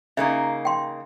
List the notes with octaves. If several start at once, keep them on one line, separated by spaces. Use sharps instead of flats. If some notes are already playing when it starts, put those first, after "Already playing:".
C#3 A#3 D#4 E5
G5 C6